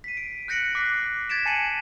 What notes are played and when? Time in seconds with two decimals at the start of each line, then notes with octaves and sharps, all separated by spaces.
0.04 B6 C7 D#7
0.17 D7
0.48 F#6 G6 A#6 C#7 D7 F#7
0.75 D6 F#6 B6 C7
1.30 G#6 A6 B6 D7 E7
1.46 G#5 A5 C7 C#7 D#7 F#7